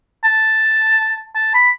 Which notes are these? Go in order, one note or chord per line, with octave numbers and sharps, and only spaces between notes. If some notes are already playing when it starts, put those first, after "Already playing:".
A5
A5
B5